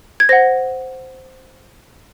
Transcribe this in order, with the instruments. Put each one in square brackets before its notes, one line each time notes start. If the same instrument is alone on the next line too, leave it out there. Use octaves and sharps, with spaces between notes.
[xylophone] G#6
C5 F#5 A#6